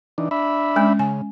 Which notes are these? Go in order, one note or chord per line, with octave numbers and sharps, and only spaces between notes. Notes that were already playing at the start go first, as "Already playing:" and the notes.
E3 D4 D#4
D4 E5 B5
G#3 C#4
C#3 G#5